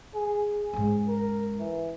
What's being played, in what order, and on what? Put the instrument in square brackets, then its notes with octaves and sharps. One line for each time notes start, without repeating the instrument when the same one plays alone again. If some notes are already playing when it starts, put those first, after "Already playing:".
[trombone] G#4
[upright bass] G#2 C#4 [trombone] G#4
[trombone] A#4
E3